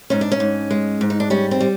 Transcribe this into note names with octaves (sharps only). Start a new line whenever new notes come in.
G#2 C#4
D4
C#4
G#2
G#3
G#2
D#4
D4
G3 C#4
C4
G3